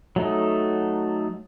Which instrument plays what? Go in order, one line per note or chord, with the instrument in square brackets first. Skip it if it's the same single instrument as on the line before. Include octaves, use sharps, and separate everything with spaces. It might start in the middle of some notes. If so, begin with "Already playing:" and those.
[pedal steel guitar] F#3 A3 D#4